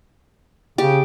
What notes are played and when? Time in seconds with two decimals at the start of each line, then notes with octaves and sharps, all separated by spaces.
0.78 C#3 G4